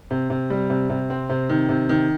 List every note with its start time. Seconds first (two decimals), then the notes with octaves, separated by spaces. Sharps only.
0.11 C3
0.30 C3
0.50 G3
0.70 C3
0.90 C3
1.10 C4
1.30 C3
1.49 D#3
1.69 C3
1.89 D#3